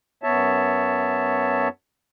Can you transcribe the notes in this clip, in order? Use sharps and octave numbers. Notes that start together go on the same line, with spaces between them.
F#2 B3 C#5 E5 A5